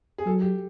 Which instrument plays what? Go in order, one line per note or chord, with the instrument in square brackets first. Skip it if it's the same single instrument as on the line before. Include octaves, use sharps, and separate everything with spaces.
[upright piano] G#4
[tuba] F#3 [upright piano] A4
[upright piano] G4